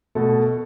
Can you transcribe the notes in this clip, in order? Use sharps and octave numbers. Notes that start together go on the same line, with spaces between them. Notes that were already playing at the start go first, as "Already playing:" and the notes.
B2 A3 A4